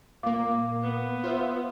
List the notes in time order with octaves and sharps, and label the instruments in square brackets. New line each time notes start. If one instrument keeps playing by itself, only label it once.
[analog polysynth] A#2 A#3 [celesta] F5 D6
[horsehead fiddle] B3
[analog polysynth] F4 C5 E5